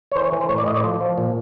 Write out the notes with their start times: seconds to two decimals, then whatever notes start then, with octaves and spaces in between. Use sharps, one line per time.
0.12 C#5
0.15 E3 C5
0.24 C#5
0.32 E3
0.41 C5
0.49 A2 C#5
0.58 D5
0.66 A2 D#5
0.75 D5
0.84 F3 C5
1.01 F3
1.18 A#2